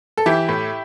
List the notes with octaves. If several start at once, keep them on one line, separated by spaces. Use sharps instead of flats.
A4
E3 E4 G4
A2